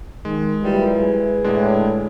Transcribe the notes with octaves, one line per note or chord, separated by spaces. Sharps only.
D#3 G#3
A#2 F#3 G3 E4 B4
G#4
A2 D3 G#3 D4